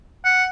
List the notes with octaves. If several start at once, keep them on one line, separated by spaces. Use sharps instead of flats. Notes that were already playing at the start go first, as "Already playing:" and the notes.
F#5